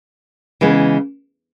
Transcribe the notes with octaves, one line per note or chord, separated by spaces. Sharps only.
C#3 E3 G#3 B3